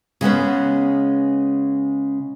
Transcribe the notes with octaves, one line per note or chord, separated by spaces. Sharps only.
C#3 G#3 B3 C#4